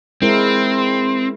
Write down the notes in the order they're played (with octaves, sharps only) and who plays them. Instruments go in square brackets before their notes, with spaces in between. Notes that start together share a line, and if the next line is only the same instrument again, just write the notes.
[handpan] G#3 E4 A#4 [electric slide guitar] C4